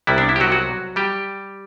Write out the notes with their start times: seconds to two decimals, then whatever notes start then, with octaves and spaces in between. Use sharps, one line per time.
0.07 C2 C3 G3 B3 E4
0.18 D4
0.29 E4
0.36 G4
0.40 F#3 F#4
0.52 F#3 F#4
0.96 G3 G4